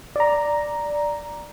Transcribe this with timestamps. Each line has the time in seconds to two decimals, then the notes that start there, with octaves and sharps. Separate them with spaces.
0.16 D5 A#5